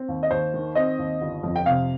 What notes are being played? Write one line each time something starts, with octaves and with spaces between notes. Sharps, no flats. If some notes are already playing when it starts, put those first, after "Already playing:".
Already playing: C4
D#2
D#5
D#2 C5
D#3
C4 D#5
D#2
G1
F2
G5
C3 F5